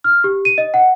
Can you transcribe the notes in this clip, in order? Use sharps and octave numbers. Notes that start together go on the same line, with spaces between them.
F6
G4
D#7
D#5
F#5